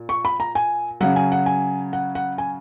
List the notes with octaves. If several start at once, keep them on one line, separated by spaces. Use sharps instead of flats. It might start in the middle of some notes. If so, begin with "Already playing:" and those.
Already playing: A#2
C#6
B5
A#5
G#5
C#3 F#3 F#5
G#5
F#5
G#5
F#5
F#5
G#5